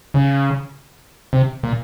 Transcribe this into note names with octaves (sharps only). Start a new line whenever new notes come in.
C#3
C3
A#2